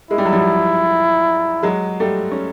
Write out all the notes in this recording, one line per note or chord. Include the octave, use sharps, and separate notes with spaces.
G#3 E4
G3
F#3
F3 G3
F#3 G#3
G3 A3
C#4